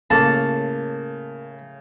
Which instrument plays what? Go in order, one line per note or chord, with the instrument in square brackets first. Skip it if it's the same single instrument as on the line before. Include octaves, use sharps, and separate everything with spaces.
[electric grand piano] A2 C#3 [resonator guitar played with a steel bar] A#3 A4 [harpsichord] A5